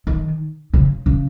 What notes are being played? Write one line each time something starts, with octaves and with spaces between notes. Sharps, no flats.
D#3
C#3
C#3